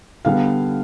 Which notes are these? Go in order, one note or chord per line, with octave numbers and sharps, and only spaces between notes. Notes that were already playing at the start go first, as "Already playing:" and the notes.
D3 G3 B3 F5